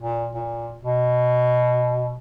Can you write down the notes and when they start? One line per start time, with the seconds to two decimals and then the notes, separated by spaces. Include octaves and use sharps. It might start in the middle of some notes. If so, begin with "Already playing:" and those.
0.01 A#2
0.34 A#2
0.84 B2